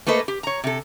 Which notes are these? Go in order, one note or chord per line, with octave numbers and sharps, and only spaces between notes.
A3 A#3 A4 B4 C5 D#5
G4
C#5 A#5
C3 A4